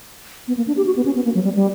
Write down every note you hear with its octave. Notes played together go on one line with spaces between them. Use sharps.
B3
A#3
D4
G4
F#4
B3
C#4
B3
A#3
F#3
G3
G3